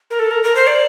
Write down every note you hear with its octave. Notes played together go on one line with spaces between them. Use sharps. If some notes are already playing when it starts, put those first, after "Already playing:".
A#4
A4
A#4
A#4
C5
D5